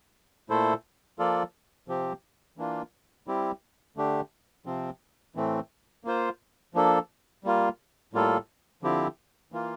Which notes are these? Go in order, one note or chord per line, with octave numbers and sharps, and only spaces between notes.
A#2 A3 E4 A4 C5
F3 A#3 F4 A4 D5
C3 F3 C4 G4
E3 A#3 D4 F4
G3 C4 E4 G4
D3 A3 D4 G4
C3 F3 C4
A2 E3 A3 C4
A#3 F4 C5
F3 A#3 D4 A4
G3 A#3 F4
A2 G3 A#3 F4 A4
D3 F3 C4 E4 G4
E3 A#3 F4